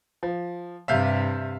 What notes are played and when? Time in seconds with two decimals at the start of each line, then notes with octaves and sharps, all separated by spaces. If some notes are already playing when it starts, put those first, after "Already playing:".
0.23 F3
0.88 G2 C3 E5 F5 G6